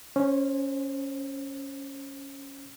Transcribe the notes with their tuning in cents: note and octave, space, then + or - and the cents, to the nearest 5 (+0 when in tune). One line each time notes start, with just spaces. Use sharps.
C#4 +0 C5 +25